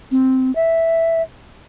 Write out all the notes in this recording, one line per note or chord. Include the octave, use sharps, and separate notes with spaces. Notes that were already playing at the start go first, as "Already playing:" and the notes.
C4
E5